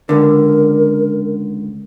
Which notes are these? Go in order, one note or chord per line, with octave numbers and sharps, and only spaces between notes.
C#2 D3 A#4